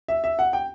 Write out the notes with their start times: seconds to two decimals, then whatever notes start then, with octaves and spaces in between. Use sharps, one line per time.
0.08 E5
0.24 E5
0.39 F#5
0.53 G5